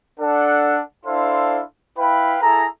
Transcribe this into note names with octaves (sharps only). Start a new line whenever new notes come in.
D4 A4 F#5
D4 E4 A4 C5 F5 C6
E4 B4 F5 G5 B5
E4 G#4 A4 A#5